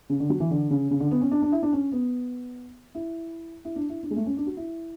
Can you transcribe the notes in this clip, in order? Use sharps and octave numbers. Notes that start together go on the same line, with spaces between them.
C#3
D3
F#3
E3
D3
C#3
C#3
D3
B3
C#4
D4
D4
E4
D4
C#4
B3
E4
E4
D4
E4
D4
G#3
A3
C#4
D4
F#4
E4